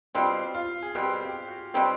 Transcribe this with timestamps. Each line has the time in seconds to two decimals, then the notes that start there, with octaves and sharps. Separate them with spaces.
0.15 B2 G3 C4 F4
0.54 F4
0.82 G#4
0.95 B2 G3 C4 G4
1.21 G4
1.48 F#4
1.74 B2 G3 C4